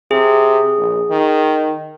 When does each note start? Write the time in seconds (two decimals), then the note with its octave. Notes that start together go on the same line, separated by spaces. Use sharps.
0.11 C3 G#4
0.78 A#1
1.10 D#3